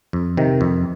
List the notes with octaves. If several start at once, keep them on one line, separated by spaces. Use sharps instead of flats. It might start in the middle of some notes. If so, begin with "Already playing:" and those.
F2
C3 D#3
F2